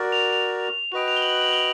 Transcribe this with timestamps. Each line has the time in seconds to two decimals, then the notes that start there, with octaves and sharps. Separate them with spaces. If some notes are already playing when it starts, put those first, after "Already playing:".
Already playing: F#4 A#4 D5
0.12 F7
0.33 F7
0.92 F#4 B4 D#5 G5 F7
1.08 F7
1.17 G7
1.22 F#7
1.37 F#7
1.53 G7